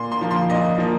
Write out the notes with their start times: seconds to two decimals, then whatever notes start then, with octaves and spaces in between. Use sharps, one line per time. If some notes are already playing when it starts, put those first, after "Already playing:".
Already playing: A#2 C6
0.12 C6
0.21 F3 A#3
0.31 C6
0.49 A#2 D#5
0.78 F3 A#3